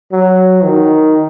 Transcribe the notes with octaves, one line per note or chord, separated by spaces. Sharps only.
F#3
D#3